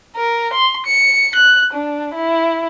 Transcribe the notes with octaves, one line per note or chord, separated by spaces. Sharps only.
A#4
C6
C#7
F#6
D4
E4